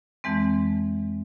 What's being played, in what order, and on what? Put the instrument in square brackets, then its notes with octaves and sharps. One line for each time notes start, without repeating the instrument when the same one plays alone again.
[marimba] F2 E3 G#3 C4